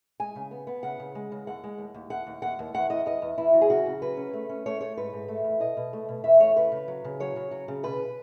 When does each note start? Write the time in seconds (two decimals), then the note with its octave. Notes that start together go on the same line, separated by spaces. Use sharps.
0.20 G#3 G#5
0.36 C#3
0.51 B3
0.67 B3
0.83 C#3 F#5
1.00 C#3
1.15 G#3
1.32 C#3
1.47 D#2 F#5
1.64 G#3
1.78 D#2
1.94 D#2
2.10 D#2 F#5
2.26 D#2
2.42 D#2 F#5
2.59 D#2
2.74 E2 F#5
2.90 E2 D#5
3.06 E2 D#5
3.22 E2
3.38 E2 E4
3.53 F#3
3.61 G#4
3.70 C#3 F#4
3.86 C#3
4.02 F#3 B4
4.17 C#4
4.33 A3
4.49 C#4
4.66 A3 C#5
4.81 A3 C#5
4.97 G#2 B4
5.13 G#2
5.28 A3
5.44 E2
5.60 B2 D#5
5.77 B2
5.93 A3
6.09 B2
6.24 E2 E5
6.40 A3 C#5
6.56 C#3 B4
6.72 C#3
6.88 F#3
7.04 C#3
7.20 F#3 C#5
7.36 C#3
7.51 F#3
7.68 C#3
7.83 B2 B4